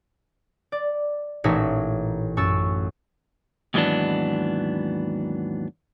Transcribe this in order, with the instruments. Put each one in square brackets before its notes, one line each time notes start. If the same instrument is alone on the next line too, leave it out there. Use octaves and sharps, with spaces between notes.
[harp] D5
A1 A#2 D#4 C#5 E5 A#6
F#2 C#6 E6 A6
[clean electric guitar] D#2 G#2 E3 F#3 B3 D4